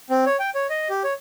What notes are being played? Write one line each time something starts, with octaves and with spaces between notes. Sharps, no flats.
C4
C#5
G5
C#5
D#5
G4
C#5